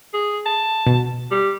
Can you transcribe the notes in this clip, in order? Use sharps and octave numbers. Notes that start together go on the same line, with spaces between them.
G#4
A5
B2
G3